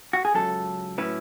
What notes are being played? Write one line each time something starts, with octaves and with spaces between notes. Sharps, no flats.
F#4
G#4
C#2 C#3 F#3 A4
A2 F#3 C#4 E4 B4